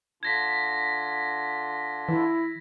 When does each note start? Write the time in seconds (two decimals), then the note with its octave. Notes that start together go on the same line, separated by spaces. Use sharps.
0.23 D3 D4 F4 G#6 A#6 B6
2.09 E3 E4